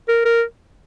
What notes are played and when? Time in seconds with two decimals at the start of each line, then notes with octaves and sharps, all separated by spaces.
0.09 A#4
0.25 A#4